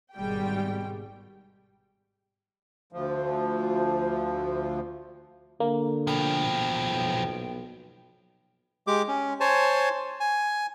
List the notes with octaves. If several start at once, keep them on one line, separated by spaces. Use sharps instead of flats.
G#1 B2 G3 G#3 G4 G5
D2 F3
D3 A#3
B2 F3 G5
B1
G#3 G4 D6
C#4
C5 C#5 G#5 A5
G#5